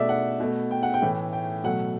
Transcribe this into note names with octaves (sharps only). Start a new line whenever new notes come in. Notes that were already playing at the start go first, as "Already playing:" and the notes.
Already playing: B2 A3 D5 E5
F#5
B2 A3
G5
F#5
G5
A2 E3 A3
G5
B2 F#3 A3 F#5